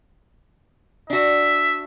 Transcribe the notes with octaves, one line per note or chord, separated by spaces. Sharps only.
D4 F#4 E5